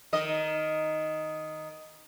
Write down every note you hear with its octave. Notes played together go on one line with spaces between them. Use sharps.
D#3 D#5